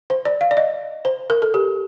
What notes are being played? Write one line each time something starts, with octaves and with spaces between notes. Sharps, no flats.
C5
D5
F5
D5
D#5
C5
A#4
A4
G4